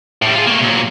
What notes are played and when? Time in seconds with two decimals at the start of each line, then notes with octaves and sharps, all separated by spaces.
0.22 A2 G3
0.35 F4 G#4
0.46 A3 A#3
0.61 A#2 F#3